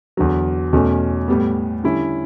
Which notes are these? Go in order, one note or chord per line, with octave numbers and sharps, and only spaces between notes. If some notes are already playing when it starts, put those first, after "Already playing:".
E2 D3 F#3
E2 B2 A3 C#4
A2 G3 B3
D3 G3 C#4 E4